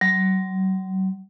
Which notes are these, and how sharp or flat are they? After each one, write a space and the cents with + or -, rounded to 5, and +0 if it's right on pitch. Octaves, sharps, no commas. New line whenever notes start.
F#3 +35